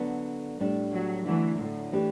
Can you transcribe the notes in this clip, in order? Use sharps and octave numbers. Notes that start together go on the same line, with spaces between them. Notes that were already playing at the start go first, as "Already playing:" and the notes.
Already playing: D3 F#3 B3 D4 A4
A2 G3 D4 A4
F#3
D3 E3 F#3 A3
A2
E3 A3 D4 G4